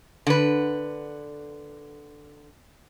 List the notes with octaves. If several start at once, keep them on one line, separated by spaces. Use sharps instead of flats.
D3 B4